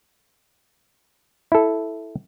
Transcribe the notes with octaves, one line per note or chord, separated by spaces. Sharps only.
E4 A4